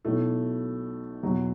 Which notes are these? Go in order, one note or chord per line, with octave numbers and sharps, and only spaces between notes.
B1 B2 A3 E4
E2 B2 F#3